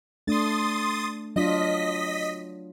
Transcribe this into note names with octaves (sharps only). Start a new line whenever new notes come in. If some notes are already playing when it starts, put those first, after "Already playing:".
A3 D4 C6 D#6 A6
F#3 D4 F4 D#5 B6